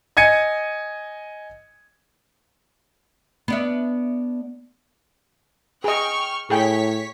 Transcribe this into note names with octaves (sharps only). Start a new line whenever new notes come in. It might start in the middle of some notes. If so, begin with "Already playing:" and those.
D#5 G#5 G#6 C#7 D#7
B3 D4 E5
G#4 D#5 G5 C#6 F6
A2 G#4 C#5 G5 C#6 B6